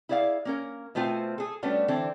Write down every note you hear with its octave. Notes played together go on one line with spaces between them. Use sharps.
E4 G#4 D5 D#5 F5
A#3 C#4 A#4
B2 A3 C4 F4 C5 G#5
G#4 A4
G3 A3 B3 C#4 D4 F#4
D3 E3 C4 D4 A4